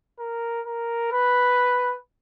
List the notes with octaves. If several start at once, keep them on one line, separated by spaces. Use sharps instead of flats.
A#4
A#4
B4